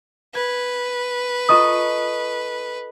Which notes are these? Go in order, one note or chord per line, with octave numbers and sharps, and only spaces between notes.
B4 G#6
F4 A4 D#5 A#5 C#6 D#6